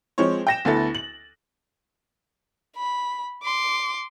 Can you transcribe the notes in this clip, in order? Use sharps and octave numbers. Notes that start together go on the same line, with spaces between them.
F3 G#3 C4 C5 C#5
G5 A#6 E7
D2 B3 E4 A4 A6
F#7
B5
C6 D6